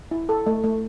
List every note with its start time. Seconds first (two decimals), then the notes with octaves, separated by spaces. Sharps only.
0.11 E4
0.29 A4
0.47 A3
0.64 A3